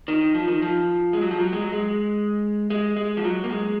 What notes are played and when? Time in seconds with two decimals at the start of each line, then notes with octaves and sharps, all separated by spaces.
0.08 D#3
0.34 F3
0.48 D#3
0.62 F3
1.13 G#3
1.21 F#3
1.31 F3
1.40 F#3
1.53 G#3
1.62 F#3
1.72 G#3
2.70 G#3
2.97 G#3
3.17 F3
3.24 F#3
3.44 A#3
3.49 G#3